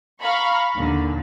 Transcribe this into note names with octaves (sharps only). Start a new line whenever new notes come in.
F5 A#5 B5 C#6
D#2 A#2 D3